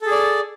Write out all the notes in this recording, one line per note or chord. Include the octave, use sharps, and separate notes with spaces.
G#4 A4 D5